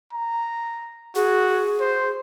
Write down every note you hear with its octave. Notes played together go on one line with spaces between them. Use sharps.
A#5
F#4 G#4
C5